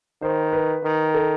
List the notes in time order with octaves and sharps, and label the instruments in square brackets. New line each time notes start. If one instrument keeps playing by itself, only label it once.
[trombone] D#3 [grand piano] C5
[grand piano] B4
[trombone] D#3
[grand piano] A4